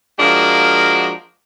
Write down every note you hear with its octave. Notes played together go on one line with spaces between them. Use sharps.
F3 G#3 A#3 D4 F#4 A#4